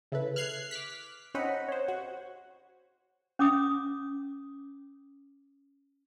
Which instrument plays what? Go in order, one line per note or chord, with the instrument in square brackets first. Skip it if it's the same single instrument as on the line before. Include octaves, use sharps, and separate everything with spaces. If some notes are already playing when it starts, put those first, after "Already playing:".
[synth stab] C#3 E4 A4 B4
F6 F#6 G#6 C7
D6 F6 F#6 B6
C4 C#4 D#4 D#5 F#5 B5
C5 C#5
F#4
[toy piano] C#4 D6 D#6